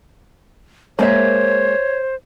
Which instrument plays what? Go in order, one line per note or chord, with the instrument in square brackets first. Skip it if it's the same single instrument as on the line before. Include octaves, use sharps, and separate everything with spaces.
[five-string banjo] G#3 A#3 E5 [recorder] C5 [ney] C#5